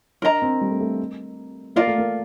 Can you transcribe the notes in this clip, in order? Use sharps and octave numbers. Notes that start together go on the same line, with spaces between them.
D4 A#4 D#5 A#5
C4
G3
A3
A3
A#3 F4 A#4 D5 F5
A3
A#3